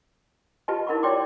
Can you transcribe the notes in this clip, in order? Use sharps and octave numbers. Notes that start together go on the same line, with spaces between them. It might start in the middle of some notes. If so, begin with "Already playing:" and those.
F4 G4 B4 D#5 G#5 A5
D#4 E4 A#4 F#5 B5 C#6
F4 C#5 D5 G5 C6 D6